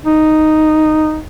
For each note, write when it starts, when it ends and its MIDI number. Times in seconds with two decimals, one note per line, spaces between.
0.06 1.21 63